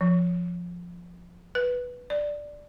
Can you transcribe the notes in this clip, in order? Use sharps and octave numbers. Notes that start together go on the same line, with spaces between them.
F3
B4
D5